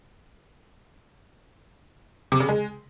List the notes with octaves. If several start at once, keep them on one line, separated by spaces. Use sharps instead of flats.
C3
C#3
G#3